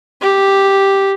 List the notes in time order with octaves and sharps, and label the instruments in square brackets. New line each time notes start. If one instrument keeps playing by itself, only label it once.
[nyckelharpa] G4